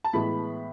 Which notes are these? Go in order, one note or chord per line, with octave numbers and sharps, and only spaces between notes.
A5
A2 E3 G#3 B3 B5